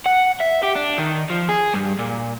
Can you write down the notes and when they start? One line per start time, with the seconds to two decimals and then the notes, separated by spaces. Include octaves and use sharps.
0.06 F#5
0.40 E5
0.63 G4
0.75 D4
0.98 D#3
1.30 F3
1.49 G#4
1.74 G2
1.99 A#2